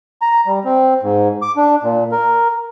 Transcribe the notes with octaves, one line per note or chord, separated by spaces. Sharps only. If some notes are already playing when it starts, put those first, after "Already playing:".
A#5
G3
C4
G#2
D6
D4
A#2
A#4